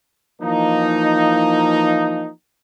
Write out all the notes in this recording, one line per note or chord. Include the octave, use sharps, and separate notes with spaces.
E3 F3 A#3 D#4